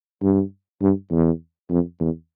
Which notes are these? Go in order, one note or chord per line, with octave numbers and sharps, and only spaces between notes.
G2
G2
E2
F2
E2